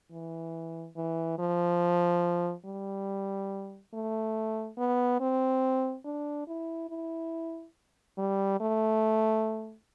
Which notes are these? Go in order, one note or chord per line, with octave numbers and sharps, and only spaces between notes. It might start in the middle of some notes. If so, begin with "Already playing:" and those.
E3
E3
F3
G3
A3
B3
C4
D4
E4
E4
G3
A3